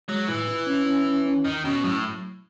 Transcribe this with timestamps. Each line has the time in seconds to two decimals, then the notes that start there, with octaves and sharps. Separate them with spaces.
0.08 F#3 G#3
0.28 A2 E3
0.48 E4
0.67 C#4
0.86 C#4
1.06 C#4
1.26 C#4
1.45 E2 D#3
1.64 B2 C#4
1.84 A2 F#3